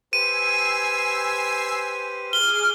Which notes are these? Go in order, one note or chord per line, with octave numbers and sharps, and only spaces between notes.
G4 B4 C5 G#5 E6 C7 D#7
G#4 D6 D#6 F6 G7